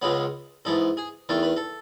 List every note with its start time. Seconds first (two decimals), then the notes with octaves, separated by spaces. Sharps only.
0.02 C#2 C#3 G#3 B3 B4
0.65 G#2 E3 B3 A4
0.97 G#4
1.29 E2 D#3 A3 A4
1.43 B4
1.57 A4